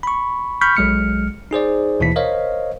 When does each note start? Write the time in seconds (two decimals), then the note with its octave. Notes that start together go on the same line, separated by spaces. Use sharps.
0.03 B5 C#6
0.61 B5 C#6 F6 G6 B6
0.77 B1 F#3 G#3 F6 C#7
1.51 D#4 G#4 C5 D5
2.00 D#2 B2 E3 E4 B6
2.16 A#4 C5 C#5 D#5 F5